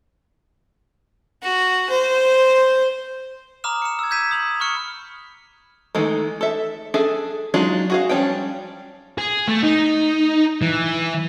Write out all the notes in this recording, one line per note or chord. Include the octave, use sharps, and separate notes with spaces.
F#4
C5
A#5 B5 D6 D#6 F6 E7
C#7 E7
E6 G#6
G6 G#6 B6 D#7 E7
D#6 F7 F#7
B5 C#6 D#6 F6 C#7 E7
D#3 E3 G#3 A3
A4 E5
D4 G#4 A4 E5
F#3 G#3 D4 D#4 F4
F#4 G#4 F5
F3 G3 C#4 D4 G5
G#4
A3
D#4
E3